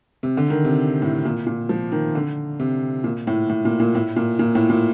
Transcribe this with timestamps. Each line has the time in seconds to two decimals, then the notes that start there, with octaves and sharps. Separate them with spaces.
0.23 C3
0.37 D3
0.50 D#3
0.65 C3
1.02 A2
1.25 A#2
1.47 A#2
1.69 F3
1.92 D#3
2.15 D3
2.60 C3
3.04 A#2
3.27 A2
3.49 A2
3.65 A#2
3.80 A#2
3.95 A2
4.16 A#2
4.39 A#2
4.55 A2
4.70 A#2